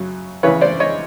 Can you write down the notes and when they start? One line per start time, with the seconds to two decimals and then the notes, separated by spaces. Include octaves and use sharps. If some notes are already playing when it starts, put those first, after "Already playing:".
Already playing: F#2 C#3 F#3
0.43 E2 C#3 E3 B4 C#5
0.61 C5 D5
0.80 C#5 D#5